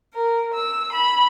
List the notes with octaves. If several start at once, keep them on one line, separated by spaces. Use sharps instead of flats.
A#4
E6
B5